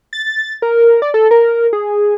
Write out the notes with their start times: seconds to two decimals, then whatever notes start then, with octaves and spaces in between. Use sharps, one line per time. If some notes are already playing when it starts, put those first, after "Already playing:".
0.13 A6
0.62 A#4
1.02 D5
1.14 A4
1.31 A#4
1.73 G#4